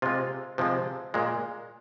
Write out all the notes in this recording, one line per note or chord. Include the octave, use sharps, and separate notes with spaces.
C3 G#3 F4
C3 F3 G#3
A#2 G#3